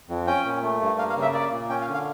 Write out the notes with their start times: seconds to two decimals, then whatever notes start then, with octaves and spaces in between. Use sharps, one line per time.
0.09 F2
0.27 C#4 G5
0.45 A#2
0.63 A3
0.81 G2
0.98 A#3 F5
1.10 F5
1.16 C#3
1.22 E5
1.34 A#3 D5
1.52 A#2
1.69 C#4 G5
1.81 F5
1.87 D3
1.94 F5